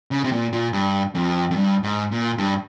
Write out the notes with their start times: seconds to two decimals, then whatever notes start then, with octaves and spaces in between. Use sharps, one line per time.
0.11 C#3
0.24 C3
0.32 A#2
0.53 A#2
0.73 G2
1.15 F2
1.51 F2
1.56 G2
1.83 G#2
2.11 A#2
2.38 G2